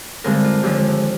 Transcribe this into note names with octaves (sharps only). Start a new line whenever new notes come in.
G2 D3 G#3 C4 A#4
F4
D#2 D3 F3 G#3 G4